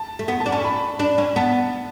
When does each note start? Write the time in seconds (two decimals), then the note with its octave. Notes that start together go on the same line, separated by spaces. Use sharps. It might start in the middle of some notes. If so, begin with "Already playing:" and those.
Already playing: A5
0.19 A3
0.28 B3
0.40 A5
0.46 D4
0.52 C#4 A5
0.64 B5
0.99 D4
1.18 C#4
1.36 B3 A5